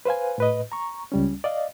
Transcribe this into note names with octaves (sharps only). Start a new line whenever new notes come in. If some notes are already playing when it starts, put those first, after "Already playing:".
B4 C5 F5 G#5
A2 B4 D#5
A#5 C#6
C#2 G3 C#4
D5 D#5 F5